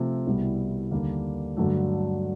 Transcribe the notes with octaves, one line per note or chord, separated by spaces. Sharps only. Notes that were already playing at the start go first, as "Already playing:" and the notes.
Already playing: C3 F3 A3 C4
C2 B2 G3 B3 E4
D#2 D3 G3 A#3
G2 D3 F#3 A3